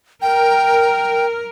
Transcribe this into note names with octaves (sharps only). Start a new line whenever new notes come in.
A#4 G5